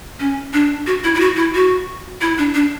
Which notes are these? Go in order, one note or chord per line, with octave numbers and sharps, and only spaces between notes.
C#4
D4
F#4
E4
E4
F#4
E4
F#4
E4
D4
D4